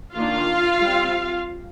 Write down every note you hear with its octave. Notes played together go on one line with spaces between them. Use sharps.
D#3 A#3 D4 F4 F5
G3 C4